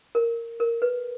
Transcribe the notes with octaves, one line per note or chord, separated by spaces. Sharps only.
A#4
A#4
B4